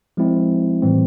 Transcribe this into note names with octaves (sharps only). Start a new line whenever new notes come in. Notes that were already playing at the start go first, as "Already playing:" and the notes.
F3 G#3 C4 E4
A2 E3 G3 C4